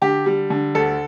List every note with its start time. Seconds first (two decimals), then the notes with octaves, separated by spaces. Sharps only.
0.01 D3 G4
0.26 G3
0.50 D3
0.75 D2 A4